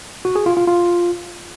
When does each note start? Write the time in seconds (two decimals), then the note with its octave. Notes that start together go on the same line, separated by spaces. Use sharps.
0.25 F#4
0.36 G#4
0.46 F4
0.57 F4
0.67 F4